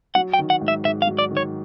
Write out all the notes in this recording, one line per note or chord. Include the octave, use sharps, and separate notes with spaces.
F#3 F#5
G5
D#3
F#5
G#2
E5
G#2 E5
F5
F#3
D5
D#3
C#5